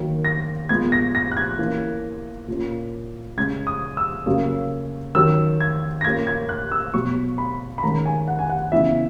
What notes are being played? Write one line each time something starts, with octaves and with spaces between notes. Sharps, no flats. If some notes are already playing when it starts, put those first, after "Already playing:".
Already playing: D#3 F#3 A#3
A#6
A#2 G#3 B3 G#6
A#6
A#6
F#6
G#6
E3 A#3 C#4
A#2 A#3 C#4
C#3 G#3 C#4 G#6
D#6
E6
C#3 F#3 A#3 C#4
D#3 F#3 C#4 E6
G#6
A#6
A#2 A#3 C#4 G#6
G#6
F#6
E6
B2 F#3 B3 C#6
B5
B5
D#3 G#3 C#4 A#5
G#5
F#5
G#5
F#5
C#3 E3 B3 E5